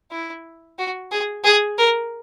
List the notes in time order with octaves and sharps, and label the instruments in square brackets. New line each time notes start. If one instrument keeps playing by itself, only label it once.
[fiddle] E4
F#4
G#4
G#4
A#4